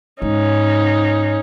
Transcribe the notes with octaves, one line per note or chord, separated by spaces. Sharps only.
G#2 C#4 D#4